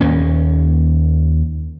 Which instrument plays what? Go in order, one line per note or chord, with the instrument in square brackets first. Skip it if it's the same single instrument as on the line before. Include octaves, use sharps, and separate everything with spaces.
[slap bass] D#2 A#3 C#4